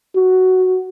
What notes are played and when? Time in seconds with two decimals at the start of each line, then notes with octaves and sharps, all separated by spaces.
0.16 F#4